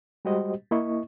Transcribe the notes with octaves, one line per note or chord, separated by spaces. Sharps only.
G3 G#3 F#4 G4 C5 D#5
A#3 E4 D#5 C#6